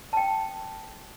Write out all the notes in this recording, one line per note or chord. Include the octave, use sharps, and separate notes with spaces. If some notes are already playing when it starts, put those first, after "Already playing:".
G5 A5